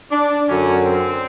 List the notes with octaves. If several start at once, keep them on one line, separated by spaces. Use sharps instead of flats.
D4
F#2 D3 F#3 C#4
C4